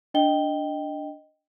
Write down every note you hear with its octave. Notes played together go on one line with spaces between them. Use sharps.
D4 D#5 G5 G7